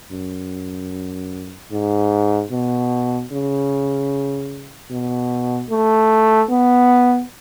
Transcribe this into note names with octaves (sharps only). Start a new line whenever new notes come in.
F#2
G#2
B2
C#3
B2
A3
B3